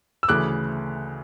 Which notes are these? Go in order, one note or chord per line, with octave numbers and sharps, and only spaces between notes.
E6
D2 C#3 E3 D6 F#6